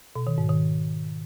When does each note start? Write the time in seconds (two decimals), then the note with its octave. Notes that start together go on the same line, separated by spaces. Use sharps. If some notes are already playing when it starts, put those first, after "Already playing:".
0.16 B2
0.27 D#3
0.38 G#2
0.49 D#3